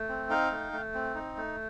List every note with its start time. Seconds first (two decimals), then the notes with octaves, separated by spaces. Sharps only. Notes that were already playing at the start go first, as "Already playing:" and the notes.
Already playing: A3
0.08 C4
0.30 D#4 F5 G5
0.51 A3
0.73 A3
0.94 C4
1.15 D#4
1.37 A3